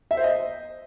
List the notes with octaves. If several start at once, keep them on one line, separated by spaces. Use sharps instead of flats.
E5
C5
D#5